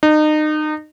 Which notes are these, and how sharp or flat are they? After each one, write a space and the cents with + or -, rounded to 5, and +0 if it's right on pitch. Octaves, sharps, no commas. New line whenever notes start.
D#4 -30